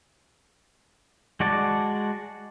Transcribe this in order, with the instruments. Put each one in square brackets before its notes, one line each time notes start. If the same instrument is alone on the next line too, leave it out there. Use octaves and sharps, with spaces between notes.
[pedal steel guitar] G#3 F#4 D5 A5